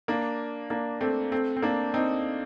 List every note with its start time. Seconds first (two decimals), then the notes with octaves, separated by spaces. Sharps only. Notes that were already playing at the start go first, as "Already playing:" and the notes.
0.08 A#3 D4
0.70 A#3 D4
1.01 A3 C4
1.32 A3 C4
1.57 C4
1.62 A#3 D4
1.94 C4 D#4